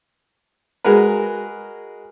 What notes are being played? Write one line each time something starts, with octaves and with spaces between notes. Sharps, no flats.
G#3 F#4 G#4 A#4 B4